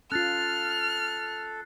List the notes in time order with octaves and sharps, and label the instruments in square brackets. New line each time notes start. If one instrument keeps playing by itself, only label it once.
[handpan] C#4 F4 [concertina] A4 [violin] F6 [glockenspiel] F#6 A6 C7